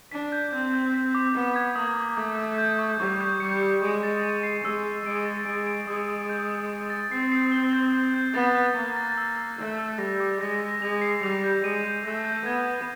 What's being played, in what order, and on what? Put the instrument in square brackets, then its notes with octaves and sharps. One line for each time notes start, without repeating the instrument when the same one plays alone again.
[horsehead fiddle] D4 [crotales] B6
[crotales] G6
[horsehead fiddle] C4 [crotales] G6
[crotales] G6
B6
D6
[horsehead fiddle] B3 [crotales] D6
[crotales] G#6
[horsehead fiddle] A#3 [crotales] D#6
[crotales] D#6
[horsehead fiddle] A3 [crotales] D#6
[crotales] D#6
G6
C#6
[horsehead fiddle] G3 [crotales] C#6
[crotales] G6
[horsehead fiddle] G3 [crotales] C#7
[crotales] E6
[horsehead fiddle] G#3 [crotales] C#6
[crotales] A6
D#7
C7
[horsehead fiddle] G#3 [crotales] E6
[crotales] C7
[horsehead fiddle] G#3 [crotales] D7
[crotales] A6
[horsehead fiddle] G#3 [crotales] D7
[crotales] D7
[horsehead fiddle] G#3 [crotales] D#6
[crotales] D#6
G6
G6
A6
A6
[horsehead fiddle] C4 [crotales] C7
[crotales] C7
G7
G6
G6
G6
[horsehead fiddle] B3 [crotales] A6
[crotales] F#6
[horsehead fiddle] A#3 [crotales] A6
[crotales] A6
E6
E6
[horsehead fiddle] A3 [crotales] E6
[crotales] E6
[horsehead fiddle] G3 [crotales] A#6
[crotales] D6
[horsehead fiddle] G#3 [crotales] A#6
[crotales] A#6
[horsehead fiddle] G#3 [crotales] F7
[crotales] C7
[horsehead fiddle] G3 [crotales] F7
[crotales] G6
[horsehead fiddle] G#3 [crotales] D#7
[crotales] G6
[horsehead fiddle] A3 [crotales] A#6
[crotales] G6
[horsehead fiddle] B3 [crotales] G#6
[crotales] G#6